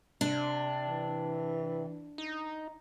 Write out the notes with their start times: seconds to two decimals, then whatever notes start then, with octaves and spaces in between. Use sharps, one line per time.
0.21 C3 D4
0.85 E3
2.18 D#4